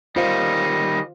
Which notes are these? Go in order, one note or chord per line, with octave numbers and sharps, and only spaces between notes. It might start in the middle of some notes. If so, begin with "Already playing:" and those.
D#3 G3 F4 C5 D#5 F5